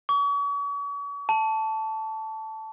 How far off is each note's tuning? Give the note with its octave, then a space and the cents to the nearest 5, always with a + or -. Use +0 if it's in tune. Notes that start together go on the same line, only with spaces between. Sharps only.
C#6 +40
A5 +0